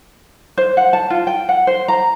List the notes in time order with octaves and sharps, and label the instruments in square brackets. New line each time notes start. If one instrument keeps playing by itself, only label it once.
[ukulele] C5
F#5
A5
F4
G5
F#5
C5
A#5